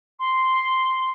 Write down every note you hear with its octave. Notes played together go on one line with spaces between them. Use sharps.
C6